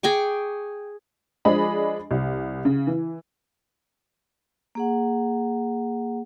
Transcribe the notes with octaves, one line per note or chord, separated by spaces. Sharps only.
G#4 G5 C#6 D6
F3 G#3 D4 G#4 D#5 B5
C2
C#3
E3
A#3 G#4 F#5